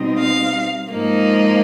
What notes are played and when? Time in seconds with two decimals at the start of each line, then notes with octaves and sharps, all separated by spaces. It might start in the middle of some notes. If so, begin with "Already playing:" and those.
Already playing: B2 G3 C4 D#4
0.18 F5
0.92 G#2 F3 A#3 D#4